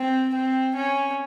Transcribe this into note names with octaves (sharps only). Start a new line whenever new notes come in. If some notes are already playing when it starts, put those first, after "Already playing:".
Already playing: C4
C4
C#4